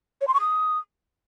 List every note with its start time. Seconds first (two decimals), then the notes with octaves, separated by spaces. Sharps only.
0.21 C#5
0.28 C6
0.34 C#6
0.40 D#6